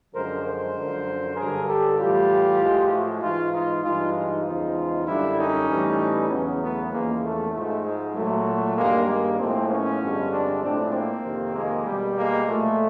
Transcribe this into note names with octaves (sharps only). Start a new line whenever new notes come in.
F#2 D3 F3 G#3 A#4 C5
A#4 C5
F#2 D3 F3
G2 D3 F#3 G#4 A#4
G4 A4
A2 E3 G3 F4 G4
A2 F3 G#3
E4 F#4
G#2 E3 G#3 D#4 F4
D#4 F4
G2 E3 G#3 D#4 F4
D#4 F4
E2 C#3 F3 G#3
F#2 D3 G3 D4 E4
C#4 D#4
A2 E3 G3
E2 C#3 F#3 B3 C#4
A3 B3
E2 C#3 F3 G#3 A#3
A3
G#2 F3 G#3 A3
G#3
A#2 F#3 A3
G2 D#3 G3 G#3 A#3
G#3 A#3
A2 F3 G#3 A#3 C4
B3 C#4
G2 D3 F3 G#3
C4 D4
A2 F3 G#3 C4 D4
A#3 C4
F2 C3 D#3
G#3 A#3
B2 G3
G#3 A#3
A#2 F3 G#3 A3